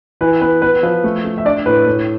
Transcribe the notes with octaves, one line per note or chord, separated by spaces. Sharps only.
E3 B4
B3 B4
B3 B4
F3 B4
A3
A3
E5
D4 D5
A2 B4
A2